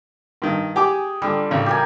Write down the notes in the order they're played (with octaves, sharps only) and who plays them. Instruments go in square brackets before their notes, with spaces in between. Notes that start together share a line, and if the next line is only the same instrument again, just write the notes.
[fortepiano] G2 D#3
[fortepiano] G4 G#5 D6 [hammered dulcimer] G#4
[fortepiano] D3 [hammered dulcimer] G3 F4
[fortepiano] A1 C#3
[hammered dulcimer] G4 A#4 G#5